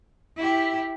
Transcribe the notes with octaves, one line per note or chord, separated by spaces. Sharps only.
E4 G4